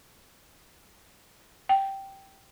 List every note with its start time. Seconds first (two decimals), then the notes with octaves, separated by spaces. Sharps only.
1.69 G5